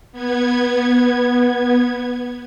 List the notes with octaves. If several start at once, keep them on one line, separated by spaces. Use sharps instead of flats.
B3 G#6